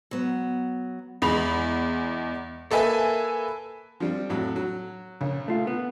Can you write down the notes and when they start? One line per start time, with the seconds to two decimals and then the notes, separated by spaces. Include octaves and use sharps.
0.11 F#3 B3
1.22 E2 G#3 B5 F7
2.71 A#3 A4 B4 E5 G#5
4.00 F3 G3 C4
4.29 F2 A2 F#3
4.56 F#3
5.21 A#1 C#3
5.48 A3 F4 F5
5.67 B3